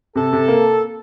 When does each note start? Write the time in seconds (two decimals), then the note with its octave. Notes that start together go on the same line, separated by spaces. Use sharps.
0.16 C3 A4
0.33 C3
0.48 A#3